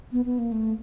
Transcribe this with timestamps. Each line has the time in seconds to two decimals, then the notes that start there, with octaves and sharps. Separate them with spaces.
0.12 B3
0.25 B3
0.39 A#3
0.52 A3